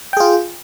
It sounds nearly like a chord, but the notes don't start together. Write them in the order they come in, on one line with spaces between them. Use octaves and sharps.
G5 G#4 F4